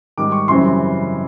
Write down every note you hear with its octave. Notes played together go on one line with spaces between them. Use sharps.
G#2 D#3 G3 D6
C#6
F#2 C#3 E3 G3 C4 C6